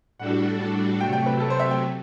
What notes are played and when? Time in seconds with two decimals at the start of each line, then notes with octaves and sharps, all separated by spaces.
0.19 A2 G3 D4 F#4 A4 F#5
1.00 C3 F#3 A3 G5
1.13 G5
1.26 B4
1.40 A4
1.50 C5
1.60 E5
1.71 G5